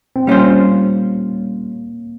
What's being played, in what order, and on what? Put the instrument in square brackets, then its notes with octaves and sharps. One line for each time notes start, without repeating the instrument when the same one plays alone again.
[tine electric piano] C4
[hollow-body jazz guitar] G3 C#4 F4 C5 [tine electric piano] A#3